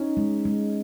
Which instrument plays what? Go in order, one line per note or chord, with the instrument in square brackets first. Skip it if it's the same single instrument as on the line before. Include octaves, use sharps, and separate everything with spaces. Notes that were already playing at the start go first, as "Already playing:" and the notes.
Already playing: [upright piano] C#4 [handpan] D#4
[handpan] G#3
G#3